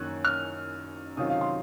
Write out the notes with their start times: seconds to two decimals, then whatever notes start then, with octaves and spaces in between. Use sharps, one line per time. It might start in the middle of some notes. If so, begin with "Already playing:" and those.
Already playing: F#2 D#3 A#3 C#4 F#6 G#6
0.25 F6
1.17 C3 D#3 F#3 C#4 F4 D#6
1.30 F5
1.41 C6